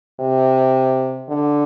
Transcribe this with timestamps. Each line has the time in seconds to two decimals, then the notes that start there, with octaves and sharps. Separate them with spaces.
0.20 C3
1.29 D3